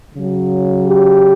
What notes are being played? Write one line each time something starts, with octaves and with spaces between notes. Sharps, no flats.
C#3 F#3
G4